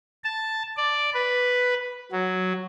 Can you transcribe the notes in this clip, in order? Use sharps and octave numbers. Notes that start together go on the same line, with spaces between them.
A5
D5
B4
F#3